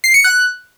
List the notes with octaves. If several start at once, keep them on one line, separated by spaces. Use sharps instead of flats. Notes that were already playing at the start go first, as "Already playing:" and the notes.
C7
C#7
F#6